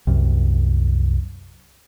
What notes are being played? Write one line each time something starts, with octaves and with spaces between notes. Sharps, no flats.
C2 F#2